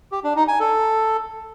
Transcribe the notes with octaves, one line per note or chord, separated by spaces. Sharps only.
G4
D4
D#4
G#5
A4